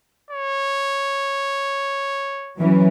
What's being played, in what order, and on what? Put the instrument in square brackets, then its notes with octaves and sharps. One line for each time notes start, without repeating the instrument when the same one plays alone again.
[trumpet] C#5
[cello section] E3 F#3 C#4